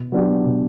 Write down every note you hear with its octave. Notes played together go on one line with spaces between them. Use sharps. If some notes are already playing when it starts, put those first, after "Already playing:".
Already playing: B2
F#3 B3 D4 G4
B2